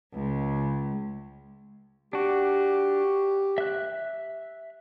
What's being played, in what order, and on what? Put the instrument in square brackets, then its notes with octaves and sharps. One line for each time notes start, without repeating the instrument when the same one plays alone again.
[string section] C#2
[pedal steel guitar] D4 F#4 [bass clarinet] G4
[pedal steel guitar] E5 F#6